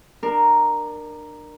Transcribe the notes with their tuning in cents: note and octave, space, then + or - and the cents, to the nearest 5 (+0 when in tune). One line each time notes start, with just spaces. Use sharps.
D4 +30 A#4 +0